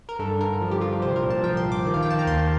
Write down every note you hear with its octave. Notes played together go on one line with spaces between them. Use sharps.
A#4
G2 A4
D3 A#4
F3
G4
G2 F4
G4
C2 C5
A#4
A#2
A5
F3 G5
C6
C2
D6
D#3
F5
G5
D#3 A5
A#5
D#2 C6